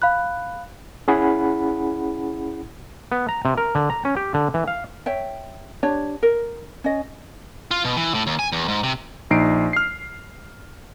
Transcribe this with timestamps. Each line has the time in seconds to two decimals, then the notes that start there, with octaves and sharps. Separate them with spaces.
0.02 F5 B5 F#6
1.08 C#4 E4 G#4 F#5 B5
3.12 B3
3.29 A#5
3.45 C3
3.57 A#4
3.75 D3
3.90 A#5
4.05 C#4
4.17 G4
4.34 D3
4.54 E3
4.68 F5
5.06 C#5 E5 G5
5.83 D4 G4 C#5
6.23 A#4
6.84 C#4 D#5
7.71 F4
7.85 B2
7.97 E3
8.14 A2
8.27 D#2
8.39 G#5
8.52 E2
8.68 G#2
8.83 C3
9.30 A#1 D#4 C7 D7
9.73 F6 C7